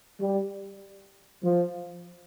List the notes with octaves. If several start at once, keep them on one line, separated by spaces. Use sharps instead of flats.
G3
F3